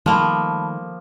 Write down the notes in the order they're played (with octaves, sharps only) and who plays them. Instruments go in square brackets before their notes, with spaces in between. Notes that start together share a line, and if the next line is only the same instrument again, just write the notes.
[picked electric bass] D#3 G3 A3 [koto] F3 A#3 [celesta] A5 B5